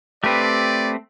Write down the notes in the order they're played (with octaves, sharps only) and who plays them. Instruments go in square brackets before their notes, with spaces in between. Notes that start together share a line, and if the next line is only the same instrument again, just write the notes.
[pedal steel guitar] A3 C4 [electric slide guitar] G4 B4 [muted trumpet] D5